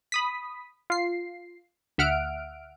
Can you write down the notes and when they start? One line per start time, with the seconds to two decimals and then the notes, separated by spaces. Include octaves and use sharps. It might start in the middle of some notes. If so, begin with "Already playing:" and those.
0.12 B5 D#6 B6
0.90 F4 C7
1.98 D2 E5 F#5 F6 D7